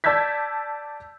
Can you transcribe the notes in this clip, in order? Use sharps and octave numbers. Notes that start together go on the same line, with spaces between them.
D5 A5 E6 G6 G#6 B6